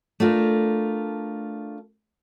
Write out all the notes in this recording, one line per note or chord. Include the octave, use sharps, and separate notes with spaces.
A3 D4 F4 A#4